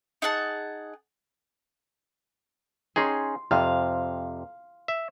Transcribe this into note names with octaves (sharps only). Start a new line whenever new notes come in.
D#4 G#4 F#5 A5
C#4 D#4 G#4 C6
F2 C3 F5
E5